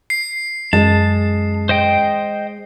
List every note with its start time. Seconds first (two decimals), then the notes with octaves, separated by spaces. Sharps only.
0.10 C7
0.73 F#2 G#3 A5
1.69 C5 D#5 G5